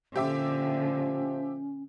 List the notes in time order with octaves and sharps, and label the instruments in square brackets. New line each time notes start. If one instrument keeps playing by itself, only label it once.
[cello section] A#2 D3 [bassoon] F3 [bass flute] C#4 [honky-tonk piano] G4 E5 D6